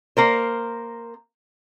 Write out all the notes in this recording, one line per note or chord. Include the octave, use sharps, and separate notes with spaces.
A#3 A#4 C5